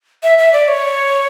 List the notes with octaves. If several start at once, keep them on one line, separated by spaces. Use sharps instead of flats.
E5
E5
D5
C#5